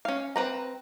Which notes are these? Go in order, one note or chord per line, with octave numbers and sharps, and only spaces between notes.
C#4 F5
C4 B4 A#5